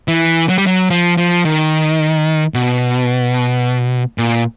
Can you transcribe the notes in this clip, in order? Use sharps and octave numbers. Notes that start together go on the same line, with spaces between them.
E3
F#3
G3
F#3
F3
F3
D#3
B2
A#2